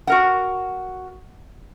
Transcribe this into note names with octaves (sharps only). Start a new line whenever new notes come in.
F#4 A#4 F#5